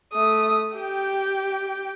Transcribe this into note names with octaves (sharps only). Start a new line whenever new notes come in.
A3 D#6
G4 G5